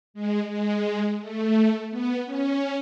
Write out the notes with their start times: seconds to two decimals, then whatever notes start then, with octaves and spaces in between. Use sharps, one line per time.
0.14 G#3
0.50 G#3
1.20 A3
1.90 B3
2.25 C#4